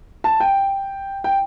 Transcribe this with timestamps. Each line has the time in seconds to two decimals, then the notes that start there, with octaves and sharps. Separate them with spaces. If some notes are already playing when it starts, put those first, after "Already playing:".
0.24 A5
0.40 G5
1.24 G5